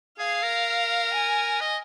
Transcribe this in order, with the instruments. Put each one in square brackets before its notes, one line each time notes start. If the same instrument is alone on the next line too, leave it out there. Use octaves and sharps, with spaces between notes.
[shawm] G#4 [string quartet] F5
[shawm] A#4
[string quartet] G#5
[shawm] D#5